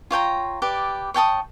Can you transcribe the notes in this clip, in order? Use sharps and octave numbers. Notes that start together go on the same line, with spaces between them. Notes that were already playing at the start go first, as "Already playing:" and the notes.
F4 C#5 G5 A#5
G4 B4 D5
C#5 G5 A5 D#6